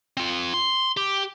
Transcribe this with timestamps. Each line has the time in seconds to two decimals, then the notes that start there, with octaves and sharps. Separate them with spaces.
0.17 C4 F4
0.54 C6
0.97 G4